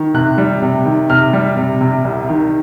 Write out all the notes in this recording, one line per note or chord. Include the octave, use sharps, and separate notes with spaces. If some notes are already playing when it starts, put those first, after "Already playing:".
Already playing: D#3
C3 F#6
G3
C3
D#3
C3 F6
G3
C3
C3
C2
D#3